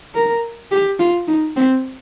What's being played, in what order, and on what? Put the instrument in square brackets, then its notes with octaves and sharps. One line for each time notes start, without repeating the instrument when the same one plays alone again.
[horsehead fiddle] A#4
G4
F4
D#4
C4